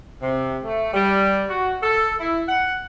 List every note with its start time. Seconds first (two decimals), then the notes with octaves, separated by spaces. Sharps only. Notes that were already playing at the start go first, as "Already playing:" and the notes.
0.22 C3
0.64 A3
0.93 G3
1.49 F#4
1.83 A4
2.20 E4
2.48 F#5